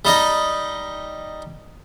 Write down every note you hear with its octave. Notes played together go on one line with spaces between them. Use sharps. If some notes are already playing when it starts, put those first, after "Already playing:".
G3 D#4 D#5